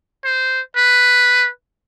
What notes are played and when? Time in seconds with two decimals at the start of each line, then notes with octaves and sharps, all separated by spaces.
0.25 C5
0.76 B4